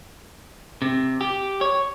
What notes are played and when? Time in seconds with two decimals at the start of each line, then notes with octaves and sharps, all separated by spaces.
0.82 C3
1.21 G4
1.61 C#5